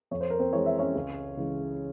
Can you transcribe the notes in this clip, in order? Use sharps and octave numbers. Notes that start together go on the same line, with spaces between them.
F2 C#5
C5
A#4
C4 C5
E3 G#3 C#5
E5
C#4 C#5
C#2
C#3 E3 G#3